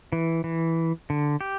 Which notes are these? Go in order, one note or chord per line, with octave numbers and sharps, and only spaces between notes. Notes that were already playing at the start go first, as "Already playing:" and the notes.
E3
E3
D3
G4